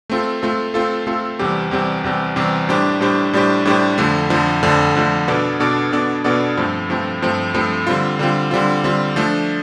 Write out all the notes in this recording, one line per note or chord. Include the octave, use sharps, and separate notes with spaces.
A3 C4 F4 A4
A3 C4 F4 A4
A3 C4 F4 A4
A3 C4 F4 A4
E2 C3 G3 C4 G4
E2 C3 G3 C4 G4
E2 C3 G3 C4 G4
E2 C3 G3 C4 G4
A2 G3 D4 G4 C5
A2 G3 D4 G4 C5
A2 G3 D4 G4 C5
A2 G3 D4 G4 C5
F2 D3 F3 A3
F2 D3 F3 A3
F2 D3 F3 A3
F2 D3 F3 A3
B2 B3 D4 A4 D5
B2 B3 D4 A4 D5
B2 B3 D4 A4 D5
B2 B3 D4 A4 D5
G2 F3 A3 C4
G2 F3 A3 C4
G2 F3 A3 C4
G2 F3 A3 C4
D3 G3 C4 F4
D3 G3 C4 F4
D3 G3 C4 F4
D3 G3 C4 F4
F3 A3 D4